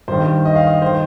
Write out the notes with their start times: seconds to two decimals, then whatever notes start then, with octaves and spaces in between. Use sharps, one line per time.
0.08 G2 D#3 C5
0.45 D#5
0.56 F5
0.67 D#5
0.82 D#3 C5